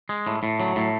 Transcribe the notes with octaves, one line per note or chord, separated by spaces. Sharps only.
G#3
A2
A2
F#3
A2